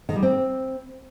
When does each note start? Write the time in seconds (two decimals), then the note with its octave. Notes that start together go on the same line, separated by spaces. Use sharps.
0.09 D#3
0.16 G3
0.23 C4